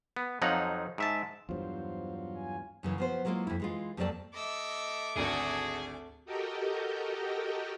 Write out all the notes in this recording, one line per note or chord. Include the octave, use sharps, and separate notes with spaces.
B3
F2 F3 F#3 D#4 F#5 A#5
G#2 E5 A5
E2 G2 F#3 F4 C5
G#5
F#2 C#3 E3
F3 B3 C5
F#3 G#3 A#3 E4 F4
F2 E4
E3 G#3 F4
F2 F#3 A3 A#3 D5 A5
A3 D#5 D6 E6
G#1 D2 F#4 G#4 A4
F#4 G4 A4 A#4 D#5 G5